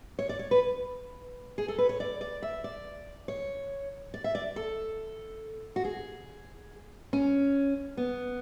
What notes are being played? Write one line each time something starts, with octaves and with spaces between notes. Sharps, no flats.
C#5
D5
C#5
B4
G#4
A4
B4
C#5
D5
D5
E5
D5
C#5
D5
E5
D5
A4
F#4
G#4
C#4
B3